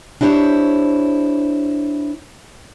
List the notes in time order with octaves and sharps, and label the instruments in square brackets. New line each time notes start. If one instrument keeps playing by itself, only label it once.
[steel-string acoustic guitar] D4 E4 G4 C5 C#5